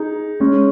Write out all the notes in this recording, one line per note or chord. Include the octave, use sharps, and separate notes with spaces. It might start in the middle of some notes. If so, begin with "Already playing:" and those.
Already playing: D#4 G#4
G#3 C#4